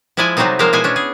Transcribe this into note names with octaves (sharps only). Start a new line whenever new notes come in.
F3 G#3 E4 D5 D#5 G#5
C3 F#3 G3 A3 C4 D#4
F3 G#3 A#3 A#4 C5 F5
B2 G#3 B3 E4 C5 G#5
C#4 D4
G#4